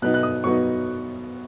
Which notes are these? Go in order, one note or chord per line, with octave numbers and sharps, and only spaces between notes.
B2 F#3 B3 D#4 F#6
F#6
D#6
B2 F#3 B3 D#4 C#6